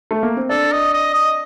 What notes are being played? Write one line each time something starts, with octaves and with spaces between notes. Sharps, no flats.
A3
A#3
C4
D4 A4
D#5
D#5
D#5